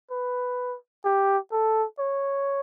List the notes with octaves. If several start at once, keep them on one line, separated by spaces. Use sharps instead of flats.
B4
G4
A4
C#5